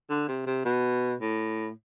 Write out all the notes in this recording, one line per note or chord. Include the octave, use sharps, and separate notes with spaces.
D3
C3
C3
B2
A2